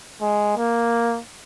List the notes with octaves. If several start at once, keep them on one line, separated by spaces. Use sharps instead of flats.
G#3
A#3